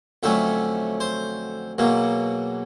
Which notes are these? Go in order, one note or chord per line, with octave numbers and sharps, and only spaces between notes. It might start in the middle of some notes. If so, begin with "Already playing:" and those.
F2 D3 F#3 A3 C#4 E5
C5
E2 B2 F#3 A#3